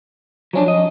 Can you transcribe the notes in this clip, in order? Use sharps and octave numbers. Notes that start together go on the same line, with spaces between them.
F3 F#3 C#4 D4
D#5